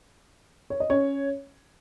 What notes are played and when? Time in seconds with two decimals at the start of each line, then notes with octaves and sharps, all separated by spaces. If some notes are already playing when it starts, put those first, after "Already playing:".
0.70 C#5
0.80 D#5
0.90 C#4 C#5